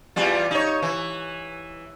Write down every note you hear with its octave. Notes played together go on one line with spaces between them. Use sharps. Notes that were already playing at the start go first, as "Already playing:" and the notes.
E2 G3 F4
D#4 C#5
E3